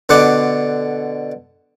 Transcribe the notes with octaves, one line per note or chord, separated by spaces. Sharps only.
B2 D3 F#5 D6